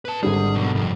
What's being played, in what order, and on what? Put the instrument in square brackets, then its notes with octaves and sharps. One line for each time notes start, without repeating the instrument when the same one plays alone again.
[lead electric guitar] B4 A5
[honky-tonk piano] G#1 D3 G3 [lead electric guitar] G#4
[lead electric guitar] B2 F#3
C2 F2